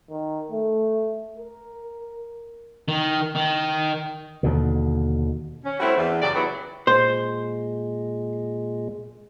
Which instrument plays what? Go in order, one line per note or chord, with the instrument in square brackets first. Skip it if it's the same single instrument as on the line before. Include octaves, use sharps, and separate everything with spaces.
[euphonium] D#3
A3
A#4
[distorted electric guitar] D#3
D#3
[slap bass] D#2 B2 D3
[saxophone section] C#4
G3 A3 C4 E4 F#4
E2
F#2 C#3 G4 D5
D#3 F#3 B3 E4 F#4
[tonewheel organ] A#2 G#3 [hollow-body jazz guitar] C5